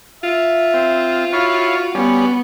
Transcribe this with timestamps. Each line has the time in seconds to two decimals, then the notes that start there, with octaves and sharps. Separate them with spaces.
0.24 F4 E5
0.74 C4
1.33 E4 F#4 C#5 F5
1.95 G3 B3 C#4